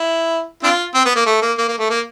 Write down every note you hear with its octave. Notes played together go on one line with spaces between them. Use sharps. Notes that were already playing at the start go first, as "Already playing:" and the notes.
Already playing: E4
C4 D4 F4
C4
B3
A#3
A3
A#3
A#3
A#3
A3
A#3